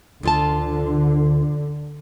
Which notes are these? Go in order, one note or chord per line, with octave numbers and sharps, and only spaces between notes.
D2 D3 F4 A5